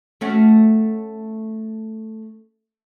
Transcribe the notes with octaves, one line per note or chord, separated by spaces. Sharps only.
A3 C#4 F#4